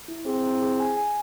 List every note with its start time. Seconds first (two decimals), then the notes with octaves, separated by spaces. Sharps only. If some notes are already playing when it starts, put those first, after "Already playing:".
0.08 E4
0.26 C4 G#4
0.44 E4
0.62 G#4
0.80 G#5
0.97 G#5